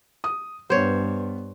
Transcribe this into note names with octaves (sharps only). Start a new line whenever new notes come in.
D#6
G2 B3 C5 C#5